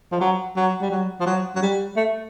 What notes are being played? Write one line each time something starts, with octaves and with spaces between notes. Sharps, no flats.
F3
F#3
F#3
G3
F#3
F3
F#3
F#3
G3
A3